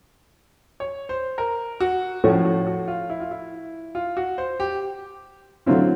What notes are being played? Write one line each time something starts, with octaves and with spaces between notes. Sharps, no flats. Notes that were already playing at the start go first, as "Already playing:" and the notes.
C#5
C5
A#4
F#4
A2 F3 A3 C#4 F#4
F#4
F#4
F4
E4
F4
E4
F4
F#4
C5
G4
D3 F#3 A3 C4 E4 F4